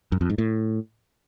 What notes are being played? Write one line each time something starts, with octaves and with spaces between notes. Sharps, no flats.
F#2
F2
G#2
A2